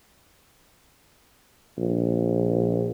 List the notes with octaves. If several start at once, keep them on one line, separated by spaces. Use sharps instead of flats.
A#1